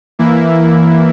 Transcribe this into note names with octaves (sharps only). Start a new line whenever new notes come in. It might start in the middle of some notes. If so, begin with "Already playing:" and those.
E3 A#3 E4